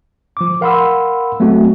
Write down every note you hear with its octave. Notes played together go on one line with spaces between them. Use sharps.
F3 D6
A#4 F5 F#5 B5 C6 E6
F#3 A3 B3 C4 F#4